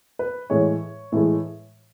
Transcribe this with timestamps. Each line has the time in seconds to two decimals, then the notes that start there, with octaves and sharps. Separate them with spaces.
0.19 B4
0.50 A2 E3 G#3 C#5
1.12 A2 E3 G#3